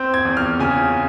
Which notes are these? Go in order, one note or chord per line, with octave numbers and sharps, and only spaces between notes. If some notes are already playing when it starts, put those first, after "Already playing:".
Already playing: C4 G6
G#6
E2
F6
C#3 G#5